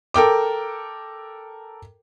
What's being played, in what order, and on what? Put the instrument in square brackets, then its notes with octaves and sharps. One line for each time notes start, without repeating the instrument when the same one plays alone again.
[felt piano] A4 A#4 G5 D6